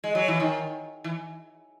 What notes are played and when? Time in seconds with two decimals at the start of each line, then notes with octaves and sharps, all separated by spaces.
0.04 G#3
0.15 F#3
0.28 E3
0.40 D#3
1.04 E3